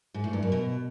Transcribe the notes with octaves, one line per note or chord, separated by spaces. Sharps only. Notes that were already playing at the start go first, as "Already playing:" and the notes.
G#2
A2
G2
F#2
B2